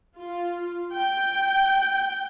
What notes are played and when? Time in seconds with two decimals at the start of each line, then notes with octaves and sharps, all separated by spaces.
0.17 F4
0.95 G5